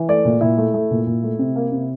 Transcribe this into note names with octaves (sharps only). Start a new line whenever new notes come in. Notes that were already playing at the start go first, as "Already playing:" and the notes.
Already playing: E3
A3 D5
A#2
A#2 E4
A3
A3
A#2
A#2
A3
C3
A#3
C3